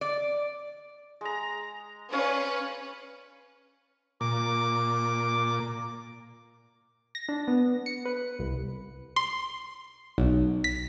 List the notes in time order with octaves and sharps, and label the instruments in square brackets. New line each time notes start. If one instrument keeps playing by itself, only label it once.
[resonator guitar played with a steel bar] D5
[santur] G#3 A#5
[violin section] C#4 B4 [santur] C#5 D5 F5
[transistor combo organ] A#2 [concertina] D6
[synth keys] A#6
D4
B3
C#7
B4
C2
[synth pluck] C6
B1
B6